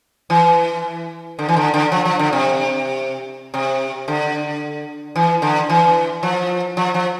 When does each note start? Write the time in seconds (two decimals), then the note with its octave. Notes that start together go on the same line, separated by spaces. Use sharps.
0.30 E3
1.39 D3
1.49 E3
1.56 D3
1.74 D3
1.92 F3
2.06 F3
2.19 D3
2.33 C3
3.54 C3
4.08 D3
5.16 E3
5.42 D3
5.70 E3
6.23 F3
6.77 F3
6.94 F3